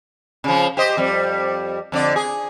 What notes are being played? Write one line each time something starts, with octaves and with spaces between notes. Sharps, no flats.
C#3 F3
G4 C5 D#5
F2 G3
F2 D3 D5
G#4